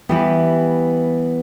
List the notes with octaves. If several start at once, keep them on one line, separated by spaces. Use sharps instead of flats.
E3 G3 B3 E4 G4